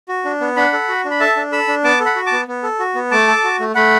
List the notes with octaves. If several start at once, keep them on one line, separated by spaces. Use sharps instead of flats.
F#4
D4
B3
D4 F#5 B5
A4
F#4
D4
B5
A4 E5 A5
D4
A4 B5 E6
D4
B3 A5 D6
A4
F#5 B5
F#4
A5 D6
B3
B3
A4
F#4
B3
A3 A5 D6
A4
F#4
A3
A3 F#5 B5